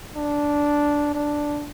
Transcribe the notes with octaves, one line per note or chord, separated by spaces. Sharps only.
D4
D4